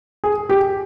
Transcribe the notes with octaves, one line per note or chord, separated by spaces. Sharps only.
G#4
G4